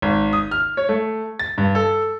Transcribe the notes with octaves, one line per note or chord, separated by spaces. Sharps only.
G#1
D#6
F6
C#5
A3
A6
G2
A4